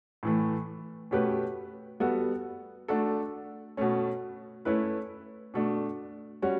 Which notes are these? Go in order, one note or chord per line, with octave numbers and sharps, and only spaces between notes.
A2 E3 A3
B2 A3 C#4 G4 B4
G3 B3 F#4 A4
A3 D4 F#4 A4
B2 A3 C#4
A3 C#4 E4 B4
B2 A3 D4
G3 C#4 F#4